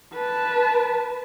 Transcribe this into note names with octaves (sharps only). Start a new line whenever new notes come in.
B4 A5